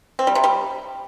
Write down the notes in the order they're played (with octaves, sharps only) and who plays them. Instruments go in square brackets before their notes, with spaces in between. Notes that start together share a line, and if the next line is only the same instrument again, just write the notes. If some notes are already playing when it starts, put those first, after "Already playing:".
[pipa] C4
G3
C3
G3